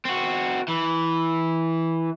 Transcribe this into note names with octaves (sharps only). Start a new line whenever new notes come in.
C4 F#4
E3